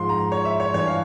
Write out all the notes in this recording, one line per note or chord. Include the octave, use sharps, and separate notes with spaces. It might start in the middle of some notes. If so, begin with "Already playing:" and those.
Already playing: G#2 F3 C6
A#5
C#5
E5
C#5
G2 E3 C#5
F5